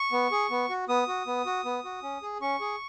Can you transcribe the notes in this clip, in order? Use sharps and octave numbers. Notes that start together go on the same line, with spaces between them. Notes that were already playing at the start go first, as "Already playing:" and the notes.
Already playing: C#6
B3
G#4
B3
F#4
B3 D#6
F#4
B3
F#4
B3
F#4
C#4
G#4
C#4 C#6
G#4